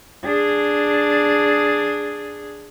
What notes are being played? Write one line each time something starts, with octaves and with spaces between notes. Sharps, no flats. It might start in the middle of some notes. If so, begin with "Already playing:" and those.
D4 G#4